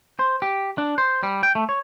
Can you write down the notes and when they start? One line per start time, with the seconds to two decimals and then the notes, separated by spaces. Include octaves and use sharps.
0.19 C5
0.42 G4
0.78 D4
0.98 C5
1.23 G3
1.43 G5
1.55 A3
1.69 C#5